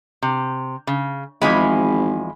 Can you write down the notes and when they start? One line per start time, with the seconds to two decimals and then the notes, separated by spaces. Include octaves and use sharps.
0.22 C3
0.87 C#3
1.42 G#1 E2 F3 G#3 G#5 B5